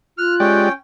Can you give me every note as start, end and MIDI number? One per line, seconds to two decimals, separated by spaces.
0.18 0.69 65
0.18 0.34 89
0.18 0.64 90
0.40 0.69 56
0.40 0.72 61
0.40 0.69 67
0.40 0.69 74
0.40 0.72 79